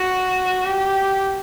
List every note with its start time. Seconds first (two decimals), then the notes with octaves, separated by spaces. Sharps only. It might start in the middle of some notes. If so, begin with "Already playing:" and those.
Already playing: F#4
0.65 G4